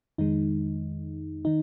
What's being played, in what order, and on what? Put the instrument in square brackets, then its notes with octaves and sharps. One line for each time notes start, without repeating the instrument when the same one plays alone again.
[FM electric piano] F2 D#3 G#3 D#4
D#3 D#4